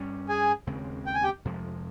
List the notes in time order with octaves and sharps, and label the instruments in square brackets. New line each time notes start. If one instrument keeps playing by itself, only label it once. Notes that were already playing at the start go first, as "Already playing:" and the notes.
Already playing: [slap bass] G2 G3 C#4
[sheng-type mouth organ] G#4 G#5
[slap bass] D#2 C#3 G#3 C4
[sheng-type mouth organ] G5
G#5
G4 G5
[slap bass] F2 C3 F3 G#3